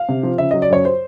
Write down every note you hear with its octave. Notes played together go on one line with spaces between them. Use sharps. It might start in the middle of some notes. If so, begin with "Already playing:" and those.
Already playing: F5
C3
F3
C#3 E5
F#3 D#5
D5
F#2 C#5
C5